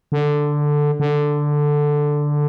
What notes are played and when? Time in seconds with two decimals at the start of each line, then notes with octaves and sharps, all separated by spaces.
0.12 D3
1.00 D3